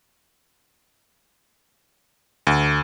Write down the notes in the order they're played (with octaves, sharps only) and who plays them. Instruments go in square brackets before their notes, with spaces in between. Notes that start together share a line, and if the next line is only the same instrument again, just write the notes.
[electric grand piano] D2